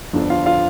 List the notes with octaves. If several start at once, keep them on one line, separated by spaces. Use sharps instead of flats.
G1 F2 D3 F3 D4
F4 F5
F4 F5